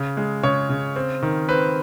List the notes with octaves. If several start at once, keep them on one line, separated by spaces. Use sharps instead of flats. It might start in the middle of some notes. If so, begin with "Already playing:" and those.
Already playing: C#3
G#3
C#3 C#5
C#3
C4
D#3
C4 B4